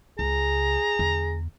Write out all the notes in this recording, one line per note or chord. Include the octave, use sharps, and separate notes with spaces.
C#2 G#4 A#5
E2 D3